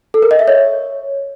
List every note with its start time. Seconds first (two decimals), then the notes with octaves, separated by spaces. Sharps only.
0.14 A4
0.22 A#4
0.31 D#5
0.39 E5
0.48 C#5